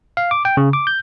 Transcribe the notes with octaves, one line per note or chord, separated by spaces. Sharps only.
F5
D6
G5
C#3
D6
G6